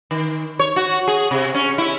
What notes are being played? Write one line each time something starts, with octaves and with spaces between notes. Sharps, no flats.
D#3
C#5
F#4
G#4
C3
C#4
E4